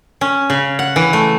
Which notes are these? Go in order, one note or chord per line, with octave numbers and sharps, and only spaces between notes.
C#4
C#3
F#5
E3
A3